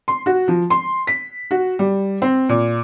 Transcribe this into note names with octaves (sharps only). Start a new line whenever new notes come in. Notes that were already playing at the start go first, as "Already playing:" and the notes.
C6
F#4
F3
C6
B6
F#4
G3
C4
A#2